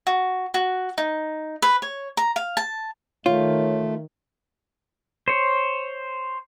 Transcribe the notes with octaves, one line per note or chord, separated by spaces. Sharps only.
F#4
F#4
D#4
B4
C#5
A#5
F5
A5
D#3 A3 F4 C#5
C5 C#5